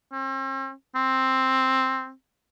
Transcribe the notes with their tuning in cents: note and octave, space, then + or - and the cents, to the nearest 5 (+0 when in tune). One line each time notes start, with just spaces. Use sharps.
C4 +45
C4 +5